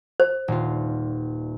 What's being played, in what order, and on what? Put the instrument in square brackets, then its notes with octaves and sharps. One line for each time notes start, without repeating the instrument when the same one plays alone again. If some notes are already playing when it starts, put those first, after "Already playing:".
[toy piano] C5
[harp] D#1 F4